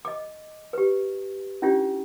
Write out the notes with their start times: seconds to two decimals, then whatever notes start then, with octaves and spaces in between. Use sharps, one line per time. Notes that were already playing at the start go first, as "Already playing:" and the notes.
0.05 D#5 D6
0.73 G4 B4
1.62 C#4 D4 E4 F4 G4